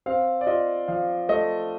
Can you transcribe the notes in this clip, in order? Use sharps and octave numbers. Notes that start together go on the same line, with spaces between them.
C4 F5
D5
F4 D#5
F3 F5
A3 D#5